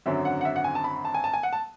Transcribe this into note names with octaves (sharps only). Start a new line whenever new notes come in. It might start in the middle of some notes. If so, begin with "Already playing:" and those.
G#1 F#2 D3 F#3 E5
F#5
F#5
E5
F#5
G#5
A5
B5
A5
G#5
A5
G#5
F#5
A5